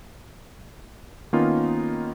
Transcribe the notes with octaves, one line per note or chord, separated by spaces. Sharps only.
D#3 A#3 B3 C#4 D#4 F4